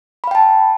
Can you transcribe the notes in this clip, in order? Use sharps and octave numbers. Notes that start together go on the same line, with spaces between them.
F5 G5 A5 B5